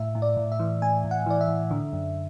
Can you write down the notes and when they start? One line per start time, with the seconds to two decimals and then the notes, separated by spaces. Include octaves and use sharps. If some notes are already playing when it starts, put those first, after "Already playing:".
Already playing: A2 E5
0.15 A2
0.22 D5
0.37 A2
0.52 E5
0.60 E3
0.82 A2 G#5
1.04 A2
1.11 F#5
1.26 E3 D5
1.41 E5
1.48 A2
1.71 D3
1.93 F#2